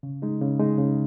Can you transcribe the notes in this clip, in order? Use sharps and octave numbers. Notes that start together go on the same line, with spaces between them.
C#3
G#3 D#4
C#3
G#3 D#4
C#3